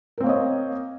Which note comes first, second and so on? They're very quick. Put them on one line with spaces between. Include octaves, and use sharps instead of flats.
A#4 C4 A#3 C#5 D#5